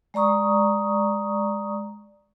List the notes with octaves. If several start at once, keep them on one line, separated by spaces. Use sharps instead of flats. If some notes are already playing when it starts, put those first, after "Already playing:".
G#3 D5 A#5 C#6 D#6